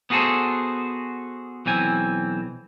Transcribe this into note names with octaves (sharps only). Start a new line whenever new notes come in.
B3 F#4 G#4 A4 C5
B1 E3 C4 G#5